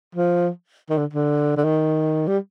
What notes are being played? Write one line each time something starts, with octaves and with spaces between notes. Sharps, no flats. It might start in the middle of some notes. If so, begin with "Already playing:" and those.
F3
D#3
D3
D3
D3
D#3
G3